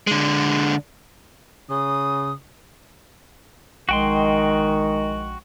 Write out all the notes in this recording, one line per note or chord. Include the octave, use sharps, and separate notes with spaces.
D3 G#3
C#3 D#6
A#1 D#3 G#3 F#4 G5 C6